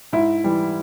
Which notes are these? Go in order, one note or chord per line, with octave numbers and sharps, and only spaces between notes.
G#2 E4
E3 G3